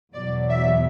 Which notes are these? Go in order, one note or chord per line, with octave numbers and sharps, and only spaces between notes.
E2 B2 F#3 D5
E5